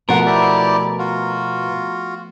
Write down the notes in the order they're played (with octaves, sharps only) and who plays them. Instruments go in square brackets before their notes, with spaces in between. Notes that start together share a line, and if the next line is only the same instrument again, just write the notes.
[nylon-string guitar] B2 F#5 [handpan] F3 A3 B3 [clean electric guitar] A#4 [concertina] A5 C6
[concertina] E4 G4 D5
F4 F#4